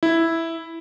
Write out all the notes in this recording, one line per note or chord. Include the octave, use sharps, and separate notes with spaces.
E4